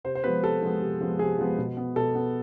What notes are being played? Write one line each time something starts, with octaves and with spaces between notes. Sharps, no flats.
C3 C5
C5
F3 G#3 B3 B4
C3 A4
F3 G#3 B3
C3
F3 G#3 B3
C3 G#4
F3 G#3 B3
B2
B3
B2 A4
B3